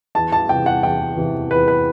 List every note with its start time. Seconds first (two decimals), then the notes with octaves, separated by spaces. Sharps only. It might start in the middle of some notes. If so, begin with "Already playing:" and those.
0.15 E2 A5
0.32 A5
0.49 C3 E3 G5
0.66 F#5
0.83 E2 G5
1.17 C3 E3
1.51 E2 B4
1.68 B4